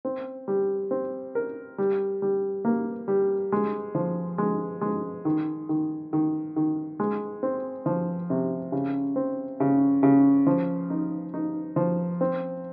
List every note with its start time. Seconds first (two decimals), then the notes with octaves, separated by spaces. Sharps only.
0.05 C4
0.48 G3
0.91 C4
1.35 A#4
1.78 G3
2.22 G3
2.65 A#3
3.08 G3
3.52 G#3
3.95 F3
4.38 G#3
4.81 G#3
5.25 D#3
5.69 D#3
6.13 D#3
6.56 D#3
7.00 G#3
7.43 C4
7.86 F3
8.30 C3
8.72 C#3
9.16 C4
9.60 C#3
10.03 C#3
10.47 F3
10.90 D#4
11.34 D#4
11.76 F3
12.21 C4